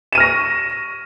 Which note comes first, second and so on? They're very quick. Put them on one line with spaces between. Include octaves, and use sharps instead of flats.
E7 D#7 F6 A#6 C#6